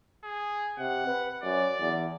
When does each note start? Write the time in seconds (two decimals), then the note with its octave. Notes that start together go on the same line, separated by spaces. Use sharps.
0.24 G#4
0.79 C3 F#5
1.07 B4
1.43 F#2 D5
1.81 E2